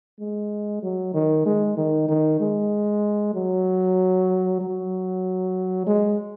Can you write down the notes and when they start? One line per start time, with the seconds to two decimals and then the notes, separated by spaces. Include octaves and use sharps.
0.19 G#3
0.82 F#3
1.14 D#3
1.46 G#3
1.77 D#3
2.08 D#3
2.40 G#3
3.34 F#3
4.61 F#3
5.87 G#3